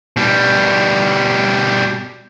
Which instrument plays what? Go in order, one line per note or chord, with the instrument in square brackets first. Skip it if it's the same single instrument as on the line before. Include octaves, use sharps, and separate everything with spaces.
[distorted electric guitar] B2 G3